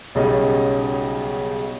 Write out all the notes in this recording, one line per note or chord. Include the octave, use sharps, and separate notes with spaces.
B1 C#3 G3 C#4 D#5